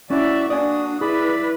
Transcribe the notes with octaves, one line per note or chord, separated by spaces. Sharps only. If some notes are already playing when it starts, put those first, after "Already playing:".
C#4 E4 F#4 D5 E5
A#3 D4 F#4 D5 G#5 D#6
E4 G#4 B4 D5 B5